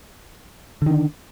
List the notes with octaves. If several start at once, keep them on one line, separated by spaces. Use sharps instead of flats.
D3 D#3 D4